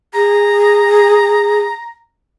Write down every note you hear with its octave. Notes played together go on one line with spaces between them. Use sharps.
G#4 A#5